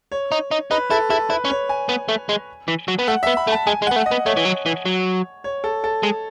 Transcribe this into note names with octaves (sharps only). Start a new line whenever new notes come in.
C#5
D#4
D#4
D#4 B4
E4 A4
E4 A4
E4 B4
C#4
C#5
G#5
B3
A3
G#3
E3
F#3
B3
A3 F#5
B3 E5
B5
A3
A5
G#3 G#5
G#3
B3 F#5
A3
D#5
B3
A3 C#5
E3
F#3
E3
F#3
C#5
A4
A4
G#3